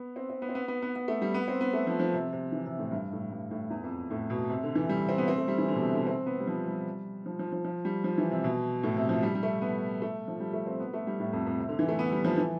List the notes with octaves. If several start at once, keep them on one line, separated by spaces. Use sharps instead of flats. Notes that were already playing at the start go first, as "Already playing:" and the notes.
Already playing: B3
C4
C4
B3
C4
B3
B3
B3
B3
A3
G3
B3
C4
B3
A3
F3
F3
C3
C3
E3
C3
A2
G2
A2
G2
A2
E2
F2
A2
B2
C3
D3
E3
G3
C4
B3
C4
A3
G3
E3
D3
B2
C3
D3
C4
B3
G3
F3
G3
F3
F3
F3
F3
G3
F3
E3
C3
B2
A2
C3
F3
G3
G3
A3
B3
A3
F3
G3
A3
C4
B3
A3
G3
A2
F2
F2
C3
D3
E3
A3
B3
G3
F3
E3